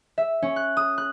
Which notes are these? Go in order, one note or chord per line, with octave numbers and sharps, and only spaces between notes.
E5
C#4
F#6
D#6
F#6